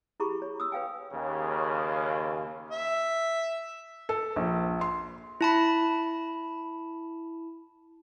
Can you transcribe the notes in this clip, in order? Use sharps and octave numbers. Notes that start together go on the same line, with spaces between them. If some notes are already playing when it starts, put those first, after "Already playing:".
E4 G4 G#4 A#5 B5 C#6
C#5
D#6 E6
B4 C#5 F5 G5 G#5
D#2 C#3
E5
A4
A#1
C6
E4 A5 B5